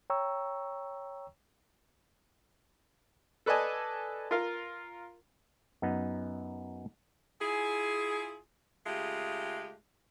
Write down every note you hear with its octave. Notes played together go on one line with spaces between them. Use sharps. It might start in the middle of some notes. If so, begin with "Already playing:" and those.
C#5 G5 A#5 C#6 E6
A4 B4 D5 D#5 G#5 A5
F4 A#4 F5
F#2 B3 D#4
E4 F4 G#4
C#3 G#3 A3 F4 G4